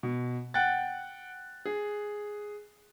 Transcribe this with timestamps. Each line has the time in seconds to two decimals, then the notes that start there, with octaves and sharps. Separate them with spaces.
0.03 B2
0.54 F#5 G5 F#6 A6
1.66 G#4